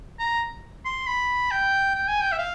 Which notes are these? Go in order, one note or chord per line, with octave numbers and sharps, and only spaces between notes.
A#5
C6
B5
G5
G5
G#5
G5
E5
F5